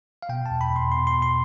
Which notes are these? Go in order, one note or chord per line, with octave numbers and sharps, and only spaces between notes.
F5
B2 G5
E2 A5
B5
E2
C6
B2 C6
C6
B2
C6